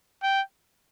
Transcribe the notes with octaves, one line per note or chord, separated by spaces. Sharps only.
G5